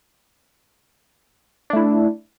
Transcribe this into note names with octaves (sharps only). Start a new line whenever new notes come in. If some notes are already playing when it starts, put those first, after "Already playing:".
A3 D4 E4